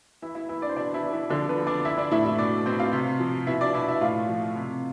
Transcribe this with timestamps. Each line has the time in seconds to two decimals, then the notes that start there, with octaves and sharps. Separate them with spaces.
0.22 E3 E4 E5
0.35 E4 E5
0.49 E3 E4 E5
0.62 D4 D5
0.69 C5
0.76 B2 D4 D5
0.94 E3 E4
1.04 B2
1.12 E3 E4
1.30 D3 F3 D4
1.48 B3 B4
1.57 F3
1.67 D4 D5
1.85 E3 E4 E5
1.98 D4 D5
2.11 A2 E4 E5
2.25 E4 E5
2.38 B2 D4 D5
2.66 B2 C4 C5
2.80 F4 F5
2.93 C3
3.20 F3
3.47 B2 E4 E5
3.61 D4 D5
3.74 B2 E4 E5
3.88 E4 E5
4.01 A2 F4 F5
4.28 F3
4.55 C3